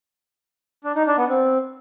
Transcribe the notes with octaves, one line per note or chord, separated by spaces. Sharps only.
D4
D#4
D4
B3
C4